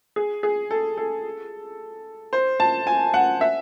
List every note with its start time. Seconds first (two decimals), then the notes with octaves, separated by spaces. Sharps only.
0.16 G#4
0.43 G#4
0.71 A4
0.97 A4
2.33 C5
2.60 A5
2.87 G#5
3.14 F#5
3.41 E5